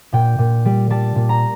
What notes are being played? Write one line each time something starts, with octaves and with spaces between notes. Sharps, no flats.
A#2 G5
A#2
G3
G3 A5
A#2
A#5